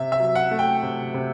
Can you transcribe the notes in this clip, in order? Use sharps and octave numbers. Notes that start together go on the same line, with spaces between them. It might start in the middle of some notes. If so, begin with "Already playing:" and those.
Already playing: C3 E5
E5
F#3
F#5
A3
G5
C3
C3